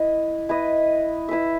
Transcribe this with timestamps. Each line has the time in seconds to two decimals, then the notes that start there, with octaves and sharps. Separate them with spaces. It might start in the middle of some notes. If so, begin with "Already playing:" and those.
Already playing: E4 B4 D#5
0.49 E4 B4 D#5
1.29 E4 B4 E5